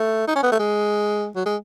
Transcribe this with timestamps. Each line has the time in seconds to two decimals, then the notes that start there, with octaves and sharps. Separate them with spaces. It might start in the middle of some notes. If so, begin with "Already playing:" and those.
Already playing: A3
0.28 D#4
0.36 C#4
0.43 B3
0.52 A3
0.59 G#3
1.36 F#3
1.46 G#3